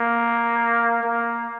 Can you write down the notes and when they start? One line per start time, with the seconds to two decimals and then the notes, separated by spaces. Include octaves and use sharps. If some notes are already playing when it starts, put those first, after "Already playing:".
Already playing: A#3
1.03 A#3